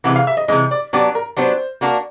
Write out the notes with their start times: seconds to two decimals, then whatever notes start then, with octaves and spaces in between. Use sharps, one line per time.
0.04 C3 E3 G#3 F#5
0.16 F5
0.27 E5
0.37 D#5
0.48 C3 E3 G#3 D#5
0.71 D5
0.93 F#3 B3 D4 G4 D5
1.15 A#4
1.37 F#3 B3 D4 G4 C5
1.81 A#3 D4 F#4 A#4